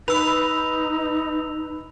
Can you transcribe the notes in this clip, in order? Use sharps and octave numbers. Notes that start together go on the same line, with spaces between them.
D#4 B4 B5 E6 F7